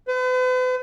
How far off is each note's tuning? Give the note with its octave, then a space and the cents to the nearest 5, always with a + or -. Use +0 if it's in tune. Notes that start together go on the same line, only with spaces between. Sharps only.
B4 +45